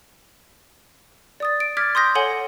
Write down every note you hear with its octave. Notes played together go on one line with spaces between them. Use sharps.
D5 D#6 A6
D7
D6 F6 G#6 A6 B6
C6 D#6 G6 A#6
A4 C#5 F#5 G#5 G7